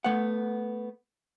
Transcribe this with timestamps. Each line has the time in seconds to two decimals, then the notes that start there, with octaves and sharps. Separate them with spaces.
0.04 A3 B3 F#5